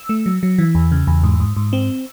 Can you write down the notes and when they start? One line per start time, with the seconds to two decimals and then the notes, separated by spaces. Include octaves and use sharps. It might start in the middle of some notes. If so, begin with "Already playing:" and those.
Already playing: E6
0.09 A3
0.26 F#3
0.43 F#3
0.58 E3
0.75 E2
0.92 C#3
1.07 E2
1.23 G#2
1.40 G#2
1.57 G#2
1.73 C4